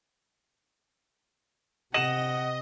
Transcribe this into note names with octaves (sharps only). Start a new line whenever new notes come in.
C3 D#5 F#5 D#7 E7 F#7